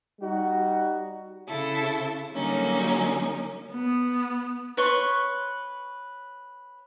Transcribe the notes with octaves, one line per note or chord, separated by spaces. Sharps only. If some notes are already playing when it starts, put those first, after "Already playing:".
G3 D#4 F#4
C#3 E4 A4
D3 F#3 G3 A#3 C#4 D#4
B3
B4 C#5 C6 C#6